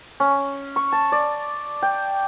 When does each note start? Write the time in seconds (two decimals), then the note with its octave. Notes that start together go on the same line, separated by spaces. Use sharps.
0.20 C#4
0.76 C#6
0.92 A5
1.12 D5
1.83 G5